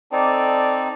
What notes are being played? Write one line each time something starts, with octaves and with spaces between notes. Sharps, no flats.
C4 D#4 A4 D5